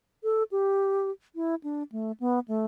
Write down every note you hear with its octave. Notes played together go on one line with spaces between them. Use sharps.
A4
G4
E4
D4
A3
B3
A3